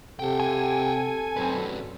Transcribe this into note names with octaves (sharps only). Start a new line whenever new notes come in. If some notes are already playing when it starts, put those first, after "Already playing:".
C3 A4 F#5 G5
G#5
F#2 C4 B4
F#3